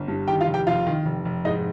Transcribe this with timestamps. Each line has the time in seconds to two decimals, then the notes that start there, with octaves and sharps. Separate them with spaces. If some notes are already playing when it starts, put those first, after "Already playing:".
Already playing: G1
0.08 G2
0.27 D#3 G4 G5
0.41 F4 F5
0.47 F1
0.54 G4 G5
0.67 F1 F4 F5
0.87 D#3
1.06 F1
1.25 F1
1.45 G#2 D#4 D#5